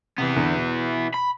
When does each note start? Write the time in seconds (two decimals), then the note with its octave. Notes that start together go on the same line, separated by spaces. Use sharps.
0.18 C3 E3 B3
0.36 E2 D3
0.55 B2
1.14 B5